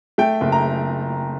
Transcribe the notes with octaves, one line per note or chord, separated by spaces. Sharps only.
A3 G5
F#1
A#5